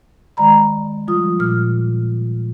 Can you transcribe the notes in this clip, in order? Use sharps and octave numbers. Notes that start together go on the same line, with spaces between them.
D#3 G#3 D5 A#5 B5
F3 G3 F4 D#6
A#2 F6